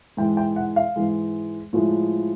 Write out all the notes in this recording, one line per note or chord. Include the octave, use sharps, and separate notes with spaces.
G#2 E3 G#3 G5
G5
F#5
F5
G#2 E3 G#3
A2 F3 G#3